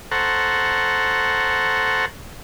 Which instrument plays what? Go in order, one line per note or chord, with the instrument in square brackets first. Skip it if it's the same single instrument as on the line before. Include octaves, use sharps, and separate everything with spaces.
[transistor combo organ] A4 C5 F#5 A#5 C#6